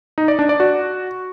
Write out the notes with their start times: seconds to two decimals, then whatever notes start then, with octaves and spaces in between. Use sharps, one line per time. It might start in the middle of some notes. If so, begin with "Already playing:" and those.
0.18 D#4
0.28 D5
0.39 D4
0.49 D5
0.60 F#4